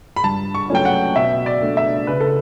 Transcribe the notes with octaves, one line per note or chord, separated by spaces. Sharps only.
B5
G2 A5
C#6
F#3 A3 C#4 G5
F#5
B2 E5
D5
A3 D4
E5
C#3 B4
A4